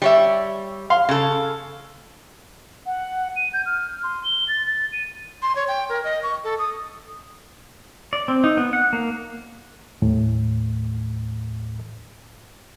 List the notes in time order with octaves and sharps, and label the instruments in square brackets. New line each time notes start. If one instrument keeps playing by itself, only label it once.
[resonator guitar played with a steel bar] G3 C#5 E5
[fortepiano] F5 C6
[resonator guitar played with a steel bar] C#3 A4
[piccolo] F#5
D#7
G6
F6
C6
G7
A6
A6
D#7
[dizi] C6
C#5
G5
A#4
D#5
C#6
A4
D#6
[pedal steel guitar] D5
C4
D#4
B3
F#5
A#3
[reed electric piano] D#2 A2